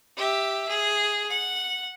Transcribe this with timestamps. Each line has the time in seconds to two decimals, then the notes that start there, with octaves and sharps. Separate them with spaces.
0.16 G4 E5
0.68 G#4
1.30 F#5